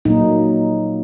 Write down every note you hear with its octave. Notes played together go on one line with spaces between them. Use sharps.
A#2 F#3 A#3 D#4